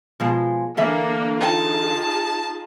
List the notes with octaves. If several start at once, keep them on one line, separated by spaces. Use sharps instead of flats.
B2 F3 G#3
D3 E3 A#3 D4 E5 F5
D#4 F4 G#4 A5